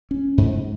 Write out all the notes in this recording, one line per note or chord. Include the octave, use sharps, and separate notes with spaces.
C#4
G#2